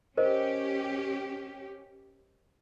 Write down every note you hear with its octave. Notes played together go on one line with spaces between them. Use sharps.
C#4 G4 A#4 C5 D#5